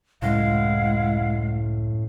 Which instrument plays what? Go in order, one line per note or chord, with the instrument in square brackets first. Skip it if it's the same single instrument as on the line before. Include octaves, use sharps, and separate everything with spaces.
[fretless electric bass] C#2 F#2 [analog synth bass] A2 [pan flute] G#3 [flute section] E4 F5 F#5